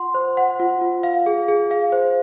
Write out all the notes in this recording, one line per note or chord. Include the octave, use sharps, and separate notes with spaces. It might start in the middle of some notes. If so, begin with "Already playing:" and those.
Already playing: F4 F#5 C6
C5
F#5
F4
F4
F5
G#4
G#4
F5
C5